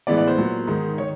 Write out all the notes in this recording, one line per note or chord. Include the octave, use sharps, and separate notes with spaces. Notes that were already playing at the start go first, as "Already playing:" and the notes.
A2 E3 G#3 B3 D5
D5
C5
A#2 F#3 B3
G#2 D#3 G#3
D#3 C#5